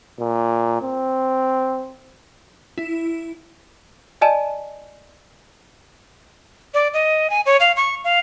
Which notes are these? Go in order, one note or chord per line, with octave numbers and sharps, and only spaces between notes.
A#2
C4
E4
D5 D#5 G#5 A5 E7
D5
D#5
G#5
C#5
F5
C#6
F5